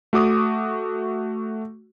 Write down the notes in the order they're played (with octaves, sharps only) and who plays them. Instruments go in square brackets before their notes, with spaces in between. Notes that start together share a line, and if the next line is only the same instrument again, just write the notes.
[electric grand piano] A3 F#4 D6 D#6